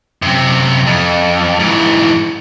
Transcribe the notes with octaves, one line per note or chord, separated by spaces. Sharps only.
F#2 C3
F2
G#2 E3